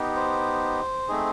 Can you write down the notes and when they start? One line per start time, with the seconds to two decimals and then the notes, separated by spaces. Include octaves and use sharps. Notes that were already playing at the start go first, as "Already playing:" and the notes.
Already playing: B3 D#4 G4
0.16 C5
1.08 A3 C4 D#4 G#4